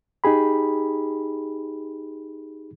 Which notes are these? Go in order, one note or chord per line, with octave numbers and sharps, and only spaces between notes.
D#4 G4 G#4 B5